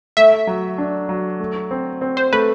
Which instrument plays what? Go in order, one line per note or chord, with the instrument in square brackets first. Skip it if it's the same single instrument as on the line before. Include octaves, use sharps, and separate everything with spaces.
[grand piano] A3 [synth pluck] E5
[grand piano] F#3
D4
F#3
A3
C4
C4
[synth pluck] C5
[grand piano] A3 [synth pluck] B4